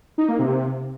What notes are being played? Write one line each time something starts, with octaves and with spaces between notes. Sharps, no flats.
D#4
A#3
C3